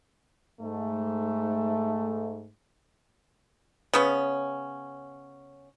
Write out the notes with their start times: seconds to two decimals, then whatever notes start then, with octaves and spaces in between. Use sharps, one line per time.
0.61 G#2 A3
3.93 C#3 B3 C#4